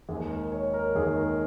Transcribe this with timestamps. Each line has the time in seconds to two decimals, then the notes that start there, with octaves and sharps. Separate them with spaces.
0.09 D#2 D#3 G#3 G#4
0.30 A#4
0.52 C#5
0.74 A#4
0.95 D#2 D#3 G#3 G#4
1.17 A#4